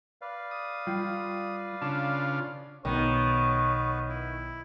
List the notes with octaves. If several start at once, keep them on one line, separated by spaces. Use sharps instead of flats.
B4 D5 F5
D#6
G3 F4 G5
C#3 D4 F4 A5
B1 B2 D#3 B3 B4 C#5
E4